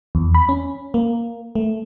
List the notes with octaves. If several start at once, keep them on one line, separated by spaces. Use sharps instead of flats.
E2
B5
C#4
A#3
A3